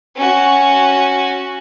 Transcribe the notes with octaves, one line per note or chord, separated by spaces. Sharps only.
C#4 F#4